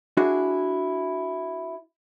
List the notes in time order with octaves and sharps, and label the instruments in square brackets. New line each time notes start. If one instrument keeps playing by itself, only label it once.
[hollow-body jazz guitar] D4 E4 F#4 G#4